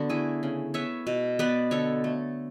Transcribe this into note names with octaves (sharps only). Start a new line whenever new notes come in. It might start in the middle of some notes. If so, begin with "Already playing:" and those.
Already playing: D3 B3 D4 F#4
A3 E4 G#4
C#3
B3 C#5 E5
B2
B3 B4 D5
D3 A4 C#5
A3